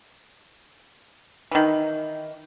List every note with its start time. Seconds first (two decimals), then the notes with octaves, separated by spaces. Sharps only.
1.51 D#3 E3